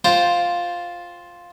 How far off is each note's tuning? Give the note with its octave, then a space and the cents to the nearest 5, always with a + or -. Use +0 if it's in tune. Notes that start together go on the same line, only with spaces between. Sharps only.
F4 +5 C5 +0 G5 +0